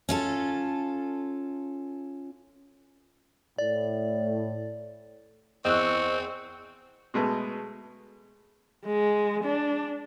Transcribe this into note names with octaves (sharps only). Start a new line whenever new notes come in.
C#4 F4 A4
A2 D5
E2 C4 D#5 C#6 E6 F#6
B2 G#3 A3 B3
G#3
D4